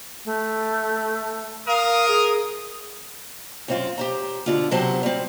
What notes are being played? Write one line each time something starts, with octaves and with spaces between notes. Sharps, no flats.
A3
A#4 F5 D#6
G#4
F#2 C4 F4
G4 C5 A#5
B2 D3 F4
C3 F#3 B3 G4 C5 A5
G3 C4